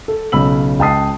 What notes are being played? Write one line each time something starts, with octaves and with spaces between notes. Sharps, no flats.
A4
B1 C#3 B5 E6 F#7
C#2 G5 A5 D#6 C7